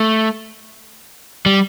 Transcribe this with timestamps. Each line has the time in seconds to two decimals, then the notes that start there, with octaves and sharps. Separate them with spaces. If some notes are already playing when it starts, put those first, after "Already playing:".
Already playing: A3
1.46 G3